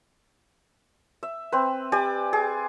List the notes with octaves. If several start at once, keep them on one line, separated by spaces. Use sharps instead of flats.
E5
C4 B4
G4 D5 G#5
G#4